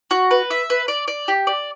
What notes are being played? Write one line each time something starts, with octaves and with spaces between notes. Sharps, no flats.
F#4
B4
E5
B4
D5
D5
G4
D5